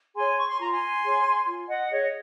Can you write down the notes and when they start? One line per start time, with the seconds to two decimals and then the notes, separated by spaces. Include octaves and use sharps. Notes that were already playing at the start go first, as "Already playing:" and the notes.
0.15 G#4 C#5 G#5 C6
0.37 C#6
0.48 C6
0.59 F4 A#5
0.71 G#5 C6
1.03 G#4 C#5
1.46 F4
1.68 D#5 F#5
1.90 G#4 C#5 D#5